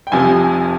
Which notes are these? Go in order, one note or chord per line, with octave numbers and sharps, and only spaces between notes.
G5
F1 F2 C3 F3 G#5